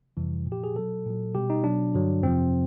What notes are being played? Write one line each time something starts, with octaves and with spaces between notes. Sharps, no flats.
F2 C3 E3 G3
A#2 F3
G4
G#4
B2 F#3 A4
A#2 F#3
B2 G3 G4
D#4
B2 F#3 D4
G2 D3 F#3
F2 C3 F3 C4